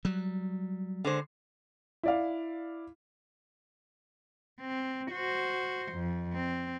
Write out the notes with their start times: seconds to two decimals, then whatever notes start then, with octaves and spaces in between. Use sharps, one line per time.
0.05 F#3 G3
1.05 D3 G#3 C5
2.03 E4 D5 F5
4.61 C4
5.12 F#4 C5
5.93 F2
6.34 C4